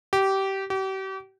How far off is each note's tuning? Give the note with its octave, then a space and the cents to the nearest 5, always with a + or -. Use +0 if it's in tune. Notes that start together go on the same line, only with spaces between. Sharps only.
G4 -20
G4 -40